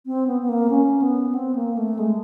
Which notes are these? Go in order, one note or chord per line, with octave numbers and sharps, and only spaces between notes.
C4
B3
B3
A#3
C#4
B3
C4
A#3
A3
G#3